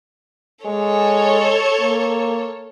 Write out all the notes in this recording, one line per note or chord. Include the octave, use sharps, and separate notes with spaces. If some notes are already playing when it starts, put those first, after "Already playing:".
G#3 A4 C#5
A#3